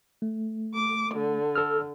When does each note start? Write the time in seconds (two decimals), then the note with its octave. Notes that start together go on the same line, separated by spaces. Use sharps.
0.22 A3
0.74 D6
1.14 D3
1.56 A4 E6 F6